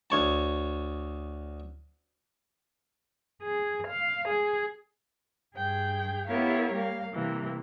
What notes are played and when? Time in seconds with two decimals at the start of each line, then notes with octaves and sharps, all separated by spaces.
0.10 D2 C#5 A5
3.43 G#4
3.88 F5
4.29 G#4
5.55 G2 G#4 G5
6.26 B3 E4 G4 A#4 C#5 F5
6.73 G3 A#3 F5
7.13 C3 E3 G3 A#3